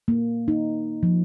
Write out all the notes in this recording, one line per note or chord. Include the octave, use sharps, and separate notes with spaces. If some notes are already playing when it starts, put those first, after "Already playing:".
A#3
D#4
F3